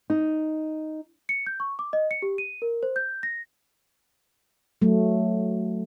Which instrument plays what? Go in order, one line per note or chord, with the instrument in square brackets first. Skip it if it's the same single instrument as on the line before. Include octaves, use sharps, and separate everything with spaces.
[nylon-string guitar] D#4
[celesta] C#7
G6
C#6
D6
D#5
C#7
G4
D#7
A#4
C5
G6
A#6
[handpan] F#3 A3